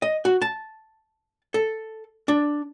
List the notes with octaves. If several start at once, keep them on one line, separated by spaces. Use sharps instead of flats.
D#5
F#4
A5
A4
D4